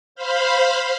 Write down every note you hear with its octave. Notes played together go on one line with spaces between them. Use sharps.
C5 F5 B5